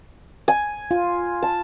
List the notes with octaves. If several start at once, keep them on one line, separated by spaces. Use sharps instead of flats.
G#5
F4
A5